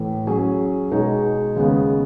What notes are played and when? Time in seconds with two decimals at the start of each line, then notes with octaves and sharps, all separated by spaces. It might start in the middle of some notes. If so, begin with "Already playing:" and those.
Already playing: A2 E3 A3
0.27 F#3 C#4 G#4
0.91 B2 G#3 D#4 G#4 C#5
1.56 D#2 C#3 G#3 B3